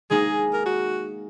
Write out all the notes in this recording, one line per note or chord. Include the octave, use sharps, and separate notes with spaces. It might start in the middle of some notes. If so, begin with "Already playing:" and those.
G#3 A#3 D#4 G#4
A#4
F#4